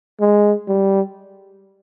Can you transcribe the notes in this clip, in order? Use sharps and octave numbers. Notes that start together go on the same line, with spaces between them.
G#3
G3